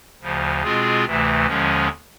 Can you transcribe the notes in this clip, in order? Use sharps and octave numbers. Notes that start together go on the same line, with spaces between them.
D2 C#3 F3
B2 G#3 C4 F4 G#4
D2 C3 E3 A3
D#2 D3 F3 G#3 C#4